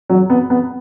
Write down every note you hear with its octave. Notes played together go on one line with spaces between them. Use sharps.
F#3
B3
B3